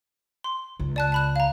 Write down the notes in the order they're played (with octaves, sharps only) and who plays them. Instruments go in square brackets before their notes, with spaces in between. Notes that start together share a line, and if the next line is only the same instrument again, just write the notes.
[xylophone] C6
[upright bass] C#2
[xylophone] D5 A5 F#6
A5 B5 F#6
F5 A#5